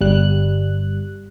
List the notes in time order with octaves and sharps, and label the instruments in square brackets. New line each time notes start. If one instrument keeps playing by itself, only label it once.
[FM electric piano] G1 G3 F#6